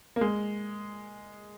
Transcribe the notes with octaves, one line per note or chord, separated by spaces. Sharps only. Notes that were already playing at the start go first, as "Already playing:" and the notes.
A#3
G#3